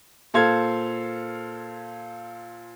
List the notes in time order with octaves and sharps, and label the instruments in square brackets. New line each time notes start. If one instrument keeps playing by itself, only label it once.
[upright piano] A#2 A4 C5 F5 G#6